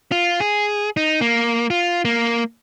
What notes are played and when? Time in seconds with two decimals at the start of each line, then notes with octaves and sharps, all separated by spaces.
0.12 F4
0.40 G#4
0.97 D#4
1.21 A#3
1.70 F4
2.05 A#3